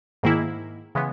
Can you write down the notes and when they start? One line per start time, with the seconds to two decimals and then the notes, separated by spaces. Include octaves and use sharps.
0.23 G#2 D#3 A#3 E4
0.95 C#3 E3 G#3 B3